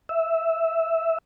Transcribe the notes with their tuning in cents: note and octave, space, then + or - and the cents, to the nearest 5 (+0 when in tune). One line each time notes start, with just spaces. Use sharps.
E5 -5